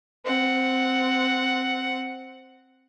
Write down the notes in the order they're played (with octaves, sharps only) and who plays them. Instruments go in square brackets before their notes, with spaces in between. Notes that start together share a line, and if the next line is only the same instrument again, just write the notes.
[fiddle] C4 F#5